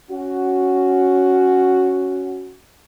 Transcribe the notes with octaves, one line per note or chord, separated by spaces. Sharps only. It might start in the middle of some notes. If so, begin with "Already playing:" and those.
C#4 F#4